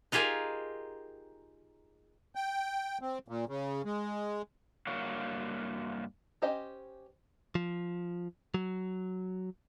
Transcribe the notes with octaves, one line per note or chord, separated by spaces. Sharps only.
D#4 F4 G4 G#4 A#4
G5
C4
A#2
C#3
G#3
G2 A#3 F#4 C#5 F5
C#4 G4 C5 D#5
F3
F#3